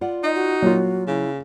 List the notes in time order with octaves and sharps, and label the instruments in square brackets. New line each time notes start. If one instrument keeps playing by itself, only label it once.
[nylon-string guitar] F4 D5 F#5
[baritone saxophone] D#4 [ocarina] D#5
[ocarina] F#4
[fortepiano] A#2 F4 [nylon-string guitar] F#3
[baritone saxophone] C#3 [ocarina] E4